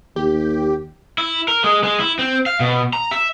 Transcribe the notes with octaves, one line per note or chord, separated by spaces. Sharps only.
D#2 G4
E4
A#4
G#3
G#3
E4
C4
F5
B2
A#5
E5